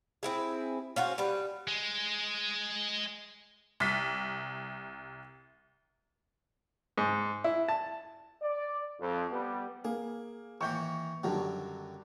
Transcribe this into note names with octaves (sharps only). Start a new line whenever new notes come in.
C4 E4 G#4
C#4 F4 F#4 C5
G3 B4
G#3
C2 B6
G#2
E4
A5
D5
F2
G3 B3
A#3 G#4
D#3 E3 A#3 C#6 G6
F#2 D3 D#3 F#3 G3 D4